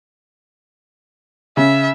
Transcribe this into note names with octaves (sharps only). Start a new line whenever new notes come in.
C#3 E5